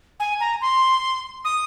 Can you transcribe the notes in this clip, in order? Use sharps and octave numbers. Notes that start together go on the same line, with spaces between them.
G#5
A#5
C6
D#6